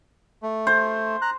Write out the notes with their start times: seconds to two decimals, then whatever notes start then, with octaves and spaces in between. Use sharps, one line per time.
0.43 A3
0.67 C5
1.22 A#5 F#6